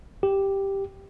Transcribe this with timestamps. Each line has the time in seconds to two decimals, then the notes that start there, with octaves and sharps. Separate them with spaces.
0.23 G4